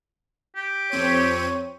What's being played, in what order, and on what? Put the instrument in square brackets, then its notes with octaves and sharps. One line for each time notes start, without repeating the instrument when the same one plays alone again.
[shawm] G4
[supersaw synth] F2 C4 D#7 [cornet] C#5